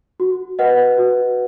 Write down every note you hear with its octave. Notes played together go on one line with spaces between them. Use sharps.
F#4
B4 D#5 F#5
F#4